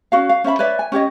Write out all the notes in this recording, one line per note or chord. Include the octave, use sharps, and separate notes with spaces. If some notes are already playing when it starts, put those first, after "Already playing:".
C#4 F#4 F5
F5
C#4 C5 E5 B5
B4 C#5 D5 E5
G#5
C#4 G4 C#5 D#5